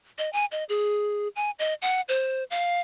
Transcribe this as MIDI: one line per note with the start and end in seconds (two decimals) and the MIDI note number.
0.18 0.30 75
0.33 0.46 80
0.52 0.64 75
0.69 1.28 68
1.36 1.51 80
1.59 1.74 75
1.82 2.01 78
2.08 2.44 72
2.50 2.81 77